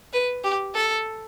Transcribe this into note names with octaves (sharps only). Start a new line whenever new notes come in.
B4
G4
A4